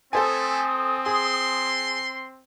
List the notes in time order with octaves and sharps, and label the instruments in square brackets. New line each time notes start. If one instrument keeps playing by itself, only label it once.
[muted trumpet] A3 [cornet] C4 [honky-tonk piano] A4 C5 G#5 [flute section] D#6
[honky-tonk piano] G#4 [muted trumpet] C6